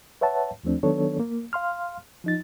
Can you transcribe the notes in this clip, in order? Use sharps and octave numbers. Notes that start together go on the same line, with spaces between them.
B4 C#5 E5 F#5 A5
D#2 F3 A3 C4 D4
D#3 F#3 B3 D4 A4 C#5
A#3
F5 C6 F6
F3 D#4 A6